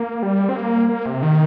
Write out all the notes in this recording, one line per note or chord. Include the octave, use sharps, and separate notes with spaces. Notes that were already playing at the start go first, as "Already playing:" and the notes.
Already playing: A#3
G3
C4
A#3
A#3
C3
D#3